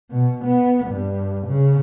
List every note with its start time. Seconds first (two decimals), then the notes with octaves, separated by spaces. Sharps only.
0.11 B2
0.44 B3
0.85 G2
1.47 C#3